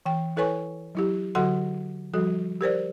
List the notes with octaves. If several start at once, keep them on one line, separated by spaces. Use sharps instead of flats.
E3 G5
E4 A4 B4 C#5 G#5 C#6
F#3 E4 G4
D3 F#3 F#4 A4 F#5 C6
F3 G3 F#4 A4
G4 A#4 C5 D5